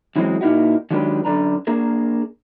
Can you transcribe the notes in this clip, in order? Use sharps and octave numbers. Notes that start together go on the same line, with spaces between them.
F#2 E3 F#3 G#3 C4
A#2 A#3 D#4 E4 F#4
D#3 F#3 G#3 D4 G4 B4
F#2 D3 D4 B4 A#5
A#3 D4 G#4 A#4